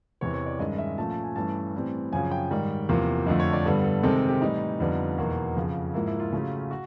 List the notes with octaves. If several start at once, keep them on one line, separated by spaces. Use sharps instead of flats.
E2 C3 E3 C#5
C#5
D5
G2 D#3 G#3 C#4 D#5
E5
A#2 F3 A3 C#4 A5
A5
G#5
G2 E3 A3 C#4 A5
A2 E3 G3 C4
F#2 C#3 F3 G#5
G5
G#2 D#3 G3
E2 C3 F3 A#3
F2 D3 F3 A3 D#5
C#5
D5
G2 D3 G3 B3 A4
A4
C3 D#3 G#3 C4 A4
A4
G4
A2 E3 G3 D#4
F2 D3 G3 B3
E2 B2 F#3 A#3
F2 C#3 F3
G#2 F3 A#3 E4
E4
F4
C#3 F#3 A3 C#4
F#4